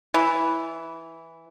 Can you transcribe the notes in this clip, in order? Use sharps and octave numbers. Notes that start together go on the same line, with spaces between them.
E3